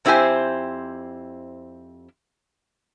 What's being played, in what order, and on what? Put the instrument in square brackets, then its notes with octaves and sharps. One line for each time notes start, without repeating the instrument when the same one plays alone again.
[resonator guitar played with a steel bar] F2 C4 E4 G4 C5 G#5